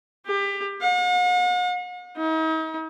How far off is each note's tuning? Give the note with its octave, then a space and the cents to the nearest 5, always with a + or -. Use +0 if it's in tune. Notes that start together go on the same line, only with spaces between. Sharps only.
G4 +25
F#5 -45
D#4 +40